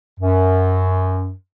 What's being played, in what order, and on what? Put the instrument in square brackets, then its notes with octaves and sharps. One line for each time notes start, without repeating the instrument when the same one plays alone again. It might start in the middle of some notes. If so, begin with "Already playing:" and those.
[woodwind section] F#2